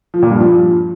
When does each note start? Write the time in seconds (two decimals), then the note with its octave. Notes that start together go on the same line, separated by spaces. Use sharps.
0.14 F3
0.22 A#2
0.31 G2
0.40 F3